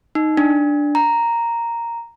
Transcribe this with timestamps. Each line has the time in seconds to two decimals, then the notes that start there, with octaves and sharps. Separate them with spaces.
0.15 D#4
0.37 D4
0.95 A#5